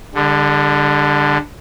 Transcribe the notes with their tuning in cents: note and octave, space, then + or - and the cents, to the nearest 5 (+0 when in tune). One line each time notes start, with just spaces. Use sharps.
D3 +0 G3 +45